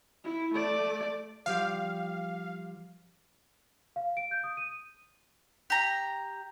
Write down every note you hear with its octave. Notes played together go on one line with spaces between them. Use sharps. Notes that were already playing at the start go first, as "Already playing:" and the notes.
E4
A3 D5
F3 G3 G4 F5
F5
D7
G6
D#6
D#7
G4 A#5